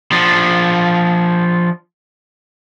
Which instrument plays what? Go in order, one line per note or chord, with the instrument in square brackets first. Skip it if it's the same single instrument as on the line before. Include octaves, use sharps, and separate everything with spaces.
[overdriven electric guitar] F3 D4